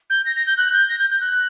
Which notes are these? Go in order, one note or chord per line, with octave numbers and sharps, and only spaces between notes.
G6
A#6
A#6
G6
F#6
G6
A#6
G6
G6
F#6